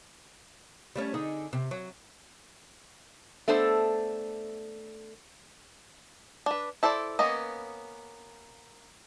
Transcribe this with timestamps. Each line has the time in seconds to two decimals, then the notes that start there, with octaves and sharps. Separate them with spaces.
0.96 G3 A3 C#4
1.14 D3 D#4 G#4
1.53 C3
1.71 F#3
3.48 A3 B3 D4 A4 C5
6.46 D4 B4
6.83 E4 A4 C5 D5
7.19 A#3 B3 C#4 D#5